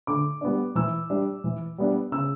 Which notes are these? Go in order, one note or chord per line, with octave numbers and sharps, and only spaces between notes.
D3 D6
G3 B3 D4
E3 E6
G3 D4
E3
G3 B3 D4
C#3 E6